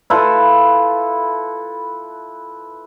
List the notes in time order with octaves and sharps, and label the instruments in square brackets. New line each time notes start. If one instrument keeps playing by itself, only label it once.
[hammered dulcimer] E4 F4 A4 B4